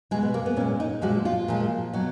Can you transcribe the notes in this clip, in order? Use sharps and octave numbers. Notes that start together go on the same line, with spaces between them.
B2 G#3 G#4
B3
A#3
B3
A#2 G#3 C#4
D#4
A#2 F3 G#3 F#4
F4
A#2 F3 G#3
B2 F#3